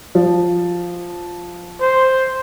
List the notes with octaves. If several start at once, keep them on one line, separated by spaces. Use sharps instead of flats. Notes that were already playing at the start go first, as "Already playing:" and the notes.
F3
C5